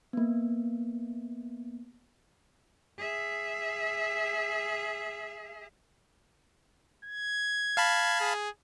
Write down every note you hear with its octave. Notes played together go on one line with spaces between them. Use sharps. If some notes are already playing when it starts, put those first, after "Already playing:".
A#3 B3
G#4 E5
G#6
F5 A5 B5
G#4